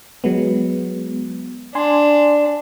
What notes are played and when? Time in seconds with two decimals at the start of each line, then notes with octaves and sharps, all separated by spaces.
0.24 F#3 G#3 B3
1.75 D4 G#5 C6